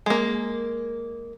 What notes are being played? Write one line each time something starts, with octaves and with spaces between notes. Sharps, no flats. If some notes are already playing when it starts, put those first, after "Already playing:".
G#3 A#3